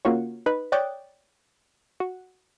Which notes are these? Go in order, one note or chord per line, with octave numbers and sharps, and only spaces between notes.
C#3 A#3 F4 F#4 C#5
D#4 B4
C#5 D5 G5 D#6 F#6 A6
F#4